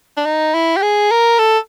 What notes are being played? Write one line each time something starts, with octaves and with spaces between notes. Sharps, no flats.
D4
D#4
E4
G4
G#4
A#4
A4